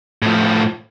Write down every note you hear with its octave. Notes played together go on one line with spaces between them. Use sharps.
A2 F3